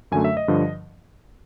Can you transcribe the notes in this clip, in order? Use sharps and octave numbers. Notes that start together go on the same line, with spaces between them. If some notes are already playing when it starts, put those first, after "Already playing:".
F#2 D3 F#3 A3 G#5
E5
D#5
G2 D3 F3